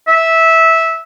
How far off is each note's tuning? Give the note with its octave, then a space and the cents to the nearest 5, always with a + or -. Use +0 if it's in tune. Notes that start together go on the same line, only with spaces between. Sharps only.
E5 -10